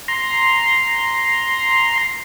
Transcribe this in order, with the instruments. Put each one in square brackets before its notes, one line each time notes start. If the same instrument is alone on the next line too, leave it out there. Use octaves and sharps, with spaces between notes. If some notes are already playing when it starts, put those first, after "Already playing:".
[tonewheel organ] A#5 C6